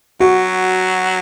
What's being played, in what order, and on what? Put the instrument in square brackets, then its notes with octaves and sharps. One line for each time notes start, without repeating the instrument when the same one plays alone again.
[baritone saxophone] F#3 [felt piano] F#4